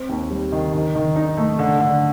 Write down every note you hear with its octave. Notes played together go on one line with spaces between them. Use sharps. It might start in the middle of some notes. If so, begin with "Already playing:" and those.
Already playing: C4
D#2
G3
D#3
D#3
D#3
D#4
A3
D3
D3